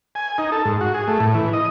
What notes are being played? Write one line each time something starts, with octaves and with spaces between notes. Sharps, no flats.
G#5
D#4
A4
G#2
F#4
G#4
A3
A2
E3
D#5